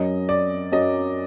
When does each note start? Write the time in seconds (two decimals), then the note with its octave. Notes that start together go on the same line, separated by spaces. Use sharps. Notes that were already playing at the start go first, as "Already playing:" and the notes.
Already playing: F#2 F#3 D#5
0.29 D5
0.72 F#2 F#3 D#5